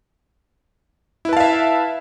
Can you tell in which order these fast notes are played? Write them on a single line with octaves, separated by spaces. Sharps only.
E4 B4 A5 F5 E5